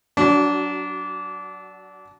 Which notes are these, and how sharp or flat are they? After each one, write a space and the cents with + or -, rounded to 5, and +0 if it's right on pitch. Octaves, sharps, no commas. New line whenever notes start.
F#3 +0 D4 -20 F#4 +25